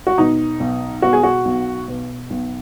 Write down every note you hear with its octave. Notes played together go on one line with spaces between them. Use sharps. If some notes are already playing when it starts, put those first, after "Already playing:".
F#4
B2 D#4
B1
B2 F#4
G#4
F#4
B1
B2
B1